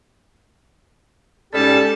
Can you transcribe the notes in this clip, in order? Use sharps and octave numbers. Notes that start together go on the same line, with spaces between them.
G#2 G3 C#4 G4 A4 D5 A5